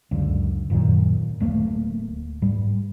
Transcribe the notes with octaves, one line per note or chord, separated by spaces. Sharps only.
C#2 F#2 D3
F#2 A#2 D#3 F#3
D1 A3 A#3
G#2 G3